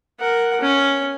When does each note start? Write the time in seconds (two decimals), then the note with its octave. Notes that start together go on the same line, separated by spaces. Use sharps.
0.20 A#4 F#5
0.61 C#4